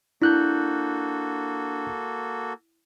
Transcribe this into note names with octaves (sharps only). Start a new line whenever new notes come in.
A#3 D4 E4 F#4 A4 F#6 G6